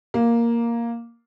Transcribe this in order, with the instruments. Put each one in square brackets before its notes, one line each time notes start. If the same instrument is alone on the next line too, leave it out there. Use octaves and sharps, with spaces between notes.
[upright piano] A#3